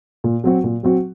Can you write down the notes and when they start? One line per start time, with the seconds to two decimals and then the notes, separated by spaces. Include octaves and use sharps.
0.24 A#2
0.44 F#3 C4 F#4
0.64 A#2
0.83 F#3 C4 F#4